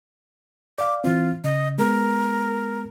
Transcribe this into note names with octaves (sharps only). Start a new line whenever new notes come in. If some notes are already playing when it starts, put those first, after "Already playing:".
D5 F5 D6
E3 C4 F4
C#3 D#5
G#3 B3 A#4